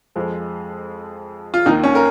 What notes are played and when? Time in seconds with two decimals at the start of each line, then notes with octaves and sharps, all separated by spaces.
0.16 F2 F3 G#3
1.54 F4
1.66 D#2 D#3 A#3 D#4
1.84 C#4
1.95 A#4